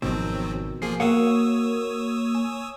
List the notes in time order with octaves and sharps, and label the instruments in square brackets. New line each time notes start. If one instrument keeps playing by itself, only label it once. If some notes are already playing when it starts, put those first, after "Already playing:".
[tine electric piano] G#1 D#3 E6 [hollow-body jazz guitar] B2 [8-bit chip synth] F3 F#3 C4
[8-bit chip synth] F3 A#3 G#4 [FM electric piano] C7
[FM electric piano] A#3 [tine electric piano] F#4 [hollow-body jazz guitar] A#4 F5 F#5 [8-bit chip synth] C#5 D#6 E6
[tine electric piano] G#5